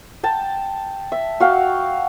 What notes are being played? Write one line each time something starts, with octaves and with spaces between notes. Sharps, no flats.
G5 A5 A#5
E5
F#4 F5 G5